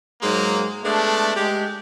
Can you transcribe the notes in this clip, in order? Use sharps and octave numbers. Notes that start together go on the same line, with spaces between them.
G#2 F#3 G#3 A#3
G#3 A3 B3 D4
G#3 G4